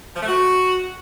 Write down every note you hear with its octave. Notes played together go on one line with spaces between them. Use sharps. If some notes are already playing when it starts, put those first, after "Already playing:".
F3
A3
F#4